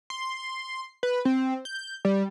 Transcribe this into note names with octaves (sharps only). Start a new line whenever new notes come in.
C6
B4
C4
G6
G3